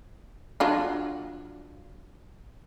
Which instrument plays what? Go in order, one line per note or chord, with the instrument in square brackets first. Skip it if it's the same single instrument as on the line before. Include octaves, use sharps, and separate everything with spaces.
[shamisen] F#3 D4 F4